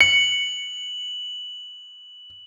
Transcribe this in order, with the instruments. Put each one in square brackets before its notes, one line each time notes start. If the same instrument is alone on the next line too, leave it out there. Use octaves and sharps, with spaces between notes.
[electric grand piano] C#7 [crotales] F#7